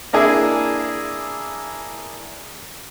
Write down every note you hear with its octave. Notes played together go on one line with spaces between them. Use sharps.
A#3 D4 E4 G#4